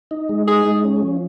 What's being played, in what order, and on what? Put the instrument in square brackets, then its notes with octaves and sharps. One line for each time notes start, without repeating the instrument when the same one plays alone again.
[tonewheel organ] D#4
G#3
[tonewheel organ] D#4 [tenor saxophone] G#4
[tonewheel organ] G#3
C#4
F3